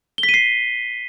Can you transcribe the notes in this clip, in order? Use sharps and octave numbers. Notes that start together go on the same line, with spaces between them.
G7
B6
D#7
C7